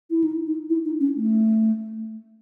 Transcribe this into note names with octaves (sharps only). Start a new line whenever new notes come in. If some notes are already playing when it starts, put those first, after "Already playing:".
E4
D#4
D#4
E4
D#4
C#4
A3